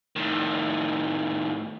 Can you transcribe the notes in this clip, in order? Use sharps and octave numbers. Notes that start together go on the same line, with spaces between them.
A2 D#3